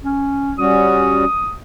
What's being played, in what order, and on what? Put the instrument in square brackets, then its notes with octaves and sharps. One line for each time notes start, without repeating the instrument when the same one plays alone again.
[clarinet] C#4
[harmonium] G3 C#4 F#4 [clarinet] D#6